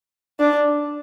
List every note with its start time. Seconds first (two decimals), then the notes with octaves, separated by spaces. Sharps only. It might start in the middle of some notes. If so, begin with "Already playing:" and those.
0.40 D4